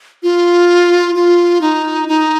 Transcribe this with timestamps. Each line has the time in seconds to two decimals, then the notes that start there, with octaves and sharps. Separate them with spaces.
0.23 F4
1.15 F4
1.61 D#4
2.08 D#4